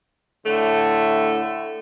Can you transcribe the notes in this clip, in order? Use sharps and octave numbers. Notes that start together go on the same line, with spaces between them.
A2 D3 A3